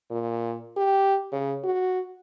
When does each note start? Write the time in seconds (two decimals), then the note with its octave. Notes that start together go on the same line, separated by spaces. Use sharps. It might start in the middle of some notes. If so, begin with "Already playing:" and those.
0.10 A#2
0.76 G4
1.32 C#3
1.64 F#4